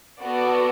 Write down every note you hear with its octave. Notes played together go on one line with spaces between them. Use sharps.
B3 F#4 A4 D5